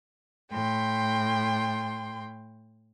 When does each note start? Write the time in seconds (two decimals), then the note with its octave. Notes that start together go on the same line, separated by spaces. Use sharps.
0.50 A2 G5 C6